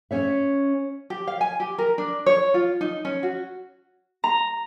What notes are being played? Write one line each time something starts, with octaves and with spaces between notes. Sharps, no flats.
C#4 C#5 E5
G4
F5
G#5
G4
A#4
D4
C#5
F4
D#4
C#4
F#4
A#5